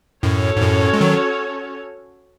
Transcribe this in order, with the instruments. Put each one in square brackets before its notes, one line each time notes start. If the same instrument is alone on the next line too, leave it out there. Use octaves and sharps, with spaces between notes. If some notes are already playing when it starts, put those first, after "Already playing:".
[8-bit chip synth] F#2 A2 [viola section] C#4 F#4 A4 C#5
[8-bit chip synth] G#2
F#2 A2
G#3
D#3 F#3